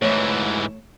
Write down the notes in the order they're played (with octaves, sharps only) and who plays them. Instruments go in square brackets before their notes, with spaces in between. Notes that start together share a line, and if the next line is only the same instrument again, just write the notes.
[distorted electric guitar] G#2 E3 [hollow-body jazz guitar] A3 C5 C#5